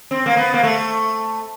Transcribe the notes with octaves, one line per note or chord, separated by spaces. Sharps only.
C4
A#3
B3
A#3
A3